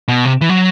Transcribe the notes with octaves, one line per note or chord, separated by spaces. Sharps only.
B2
C3
E3
F#3